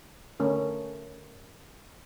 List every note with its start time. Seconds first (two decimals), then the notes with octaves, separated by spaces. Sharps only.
0.40 D3 A3 C#4 A#4